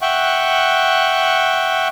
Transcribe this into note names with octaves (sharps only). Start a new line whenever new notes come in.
E5 F#5 G5 C#6 F#6